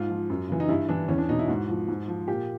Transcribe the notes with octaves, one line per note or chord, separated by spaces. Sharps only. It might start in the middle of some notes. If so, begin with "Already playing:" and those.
Already playing: G#2 F4
F3
F#2
C#3 E3
D#4
G2 E4
E3 D4
E2 C#4
D4
B2 D#4
E4
G#2 F#4
F3
G#2
F3
A#2 G4